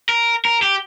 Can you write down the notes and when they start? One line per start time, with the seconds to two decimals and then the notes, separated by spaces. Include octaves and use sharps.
0.09 A#4
0.45 A#4
0.62 G4